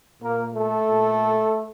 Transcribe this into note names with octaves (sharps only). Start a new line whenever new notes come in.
A#2 A#3 A#4
A3 A4
A#2